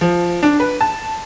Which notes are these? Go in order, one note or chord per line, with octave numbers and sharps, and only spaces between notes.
F3
D4
B4
A5